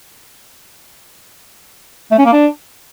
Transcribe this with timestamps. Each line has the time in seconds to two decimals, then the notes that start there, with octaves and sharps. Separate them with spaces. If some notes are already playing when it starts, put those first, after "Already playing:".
2.12 A3
2.19 C#4
2.26 A#3
2.33 D4